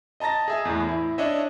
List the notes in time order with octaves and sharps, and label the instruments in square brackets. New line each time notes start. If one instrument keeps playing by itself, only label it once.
[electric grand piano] D#5 A5 A#5 A6 A#6
G#4 E5 G#5
E2 A2
E4
D4 C#5 D#5 E5